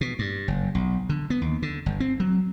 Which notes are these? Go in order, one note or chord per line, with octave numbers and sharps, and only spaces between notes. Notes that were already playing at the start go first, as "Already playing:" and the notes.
B2
G2
F#1
B1
D3
B3
D#2
D3
G1
C4
F#3